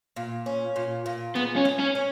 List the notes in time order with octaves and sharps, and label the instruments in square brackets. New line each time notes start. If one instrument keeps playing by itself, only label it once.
[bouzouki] A#2
C#4
A#2
A#2
[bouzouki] G#3 [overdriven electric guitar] B3
[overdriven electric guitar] C#4
[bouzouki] G#3
[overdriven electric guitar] C#4
[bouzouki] C#4